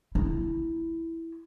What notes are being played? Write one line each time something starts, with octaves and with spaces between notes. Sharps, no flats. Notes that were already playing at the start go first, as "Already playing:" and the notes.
E4